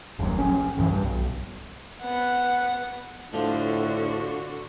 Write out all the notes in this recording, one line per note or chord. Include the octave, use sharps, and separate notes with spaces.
F#1 D#2 F#3
A#1 C#4
A#1 G2 D3 E3
G2
B1
B3 F#5
A2 D3 F3 D4 F#4